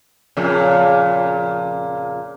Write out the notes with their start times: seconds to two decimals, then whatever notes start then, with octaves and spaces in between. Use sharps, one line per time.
0.37 F2 A#2 C#3